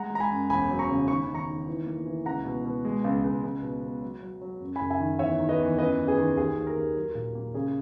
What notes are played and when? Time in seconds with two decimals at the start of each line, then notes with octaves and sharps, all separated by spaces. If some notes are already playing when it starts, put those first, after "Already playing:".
Already playing: G#3 F#5 A#5
0.10 G#3
0.15 A#5
0.20 G#5 B5
0.30 F#2
0.49 E1 G#5 B5
0.69 F#3
0.79 A#5 C#6
0.89 C#3
1.08 D#3 C#6
1.22 B5
1.28 D#3
1.34 A#5 C#6
1.47 D#3
1.67 E3
1.86 A#3
2.06 E3
2.26 C#2 F#5 A#5
2.45 B2
2.65 B2
2.85 G#3
3.04 C#2
3.24 C#2
3.44 C#2
3.63 B2
3.82 B2
4.02 F#3
4.22 F#3
4.41 F#3
4.61 F#2
4.76 G#5 B5
4.81 F#1
4.90 E5 G#5
5.00 D#3
5.19 E2 C#5 E5
5.39 D#3
5.49 B4 D#5
5.59 E2
5.78 F#2 B4 D#5
5.98 F#2
6.07 G#4 B4
6.18 D#3
6.37 D#2 G#4
6.57 D#2
6.67 A#4
6.76 D#2
6.95 F#3
7.15 A#2
7.35 A#3
7.54 C#3 G#4